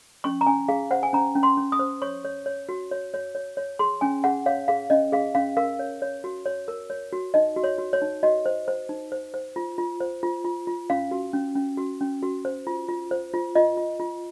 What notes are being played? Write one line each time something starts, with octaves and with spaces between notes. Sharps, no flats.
C#4 C#6
A#5
C#4 G#5
G#4 F5
C5 F#5
G#5
C#4 A#5
C#4
C6
C#4
D#6
C5
C#5 C#6
C#5
C#5
F#4
C#5
C#5
C#5
C#5
G#4 C6
C#4 G#5
G#4 F#5
C#5 F5
G#4 F5
C#4 D#5
G#4 F5
C#4 F5
A#4 F5
C#5
C#5
F#4
C#5
A#4
C#5
F#4
D#4 D#5
F#4
C#5
F#4
C#5
D#4
F#4 D#5
C5
C5
D#4
C5
C5
F4
F4
C5
F4
F4
F4
C#4 F5
F#4
C#4
C#4
F#4
C#4
F#4
C5
F4
F4
C5
F4
F4 D#5
F4
F4